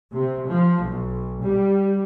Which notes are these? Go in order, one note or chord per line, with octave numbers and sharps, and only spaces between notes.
C3
F3
B1
G3